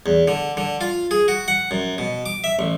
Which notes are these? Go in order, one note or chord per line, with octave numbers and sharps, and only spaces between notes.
E2
D3
D3
F4
G#4
F#4
F#5
F#2
B2
D6
E5
A1